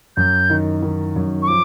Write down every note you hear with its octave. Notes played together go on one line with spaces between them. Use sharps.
F#2 G6
D#3
D#3
F#2
C#6
F3 D6